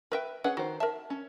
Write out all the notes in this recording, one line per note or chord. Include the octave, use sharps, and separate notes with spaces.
A#4 B4 E5 G5
C#4 G#4 B4 F#5
D#3 F#4 C5
A#4 E5 A5
C#4